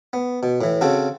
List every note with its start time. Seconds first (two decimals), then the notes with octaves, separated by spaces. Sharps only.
0.13 B3
0.43 B2
0.61 A2 E3
0.81 C#3 C4 F#4 A4